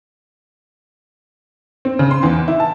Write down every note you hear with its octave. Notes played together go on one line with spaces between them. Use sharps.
C4
C#3
C6
E2
E4
A5